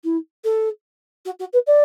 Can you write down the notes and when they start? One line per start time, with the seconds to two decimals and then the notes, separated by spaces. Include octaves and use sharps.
0.04 E4
0.44 A4
1.25 F#4
1.39 F#4
1.53 B4
1.66 D5